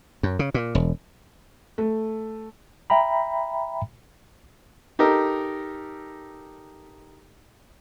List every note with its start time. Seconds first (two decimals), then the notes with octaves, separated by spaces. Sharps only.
0.23 F#2
0.39 C#3
0.54 A#2
0.75 E1
1.78 A3
2.90 E5 G5 A#5 B5
4.99 D#4 G4 A4 A#4